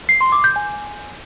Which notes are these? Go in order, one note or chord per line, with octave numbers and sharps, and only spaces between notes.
C7
C6
D6
G6
G#5